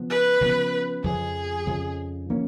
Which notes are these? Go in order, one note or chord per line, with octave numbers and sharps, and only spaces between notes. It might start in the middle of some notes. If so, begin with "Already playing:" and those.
Already playing: C#3 F3 B3
B4
C#3 F3 B3
F2 C#3 F3 G#4
F2 C#3 F3
F3 A#3 C#4